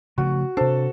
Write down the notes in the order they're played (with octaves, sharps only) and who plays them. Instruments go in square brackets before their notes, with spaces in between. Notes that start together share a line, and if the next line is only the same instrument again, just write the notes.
[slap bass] C#3 F3 A3 [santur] F#4
[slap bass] C3 D4 [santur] A4 [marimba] C5